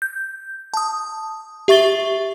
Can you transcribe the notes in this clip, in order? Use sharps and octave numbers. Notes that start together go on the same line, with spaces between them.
G6
A5 D#6
G4 E5 C#6 A6 G7